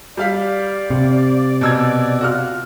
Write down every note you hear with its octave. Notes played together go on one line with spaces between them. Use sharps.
G3 D5 F5 B6
C3
B2 E6 G#6
F4 F#4 F6